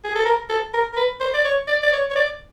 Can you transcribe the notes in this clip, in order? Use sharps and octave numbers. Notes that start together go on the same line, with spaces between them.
G#4
A4
A#4
A4
A#4
A#4
B4
C5
D5
C#5
D5
D5
C#5
C#5
D5